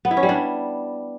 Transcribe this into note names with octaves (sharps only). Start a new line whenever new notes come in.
B3
E4
C#4
G3
D4